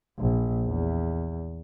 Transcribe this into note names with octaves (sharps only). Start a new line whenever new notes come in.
A#1
E2